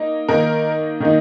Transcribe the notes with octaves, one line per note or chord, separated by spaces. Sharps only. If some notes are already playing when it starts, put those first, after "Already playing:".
Already playing: A#3 D#4
D#3 A#3 D#4 A#4
D#3 A#3 D#4